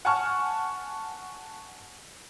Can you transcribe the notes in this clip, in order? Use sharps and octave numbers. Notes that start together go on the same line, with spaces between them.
F#5 G#5 A5 C#6 F6